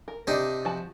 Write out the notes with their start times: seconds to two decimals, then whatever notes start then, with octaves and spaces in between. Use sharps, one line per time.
0.08 A#4
0.27 C3 D4 D#4
0.65 F3 F#4 A5